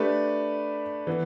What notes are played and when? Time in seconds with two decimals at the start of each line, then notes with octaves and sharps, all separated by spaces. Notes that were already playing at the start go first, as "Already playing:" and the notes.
Already playing: A3 D4 G4 B4
1.07 E3 B3